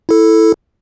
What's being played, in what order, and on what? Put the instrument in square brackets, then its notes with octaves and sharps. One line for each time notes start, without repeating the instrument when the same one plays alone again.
[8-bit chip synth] E4 A4